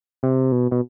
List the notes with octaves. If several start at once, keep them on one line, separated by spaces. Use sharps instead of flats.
C3
B2
B2